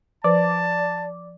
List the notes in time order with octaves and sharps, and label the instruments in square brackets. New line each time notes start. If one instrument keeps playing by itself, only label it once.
[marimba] F3 B4 C5 [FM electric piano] D5 [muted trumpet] A5